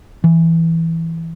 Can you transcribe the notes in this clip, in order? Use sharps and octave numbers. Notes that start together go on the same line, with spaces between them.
E3